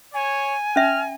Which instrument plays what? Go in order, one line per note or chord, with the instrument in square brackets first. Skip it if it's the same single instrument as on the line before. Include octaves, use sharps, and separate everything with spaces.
[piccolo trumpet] C#5 [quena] G#5
[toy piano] C#4 E5 [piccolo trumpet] F6